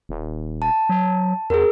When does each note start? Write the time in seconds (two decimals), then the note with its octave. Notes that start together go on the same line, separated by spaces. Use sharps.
0.09 D#1
0.62 A5
0.89 F#3
1.50 E2 G#4 A#4